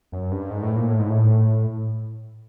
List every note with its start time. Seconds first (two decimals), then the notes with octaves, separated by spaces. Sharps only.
0.12 F#2
0.32 G2
0.50 G#2
0.63 A2
0.76 A#2
0.88 A2
0.99 G#2
1.10 A2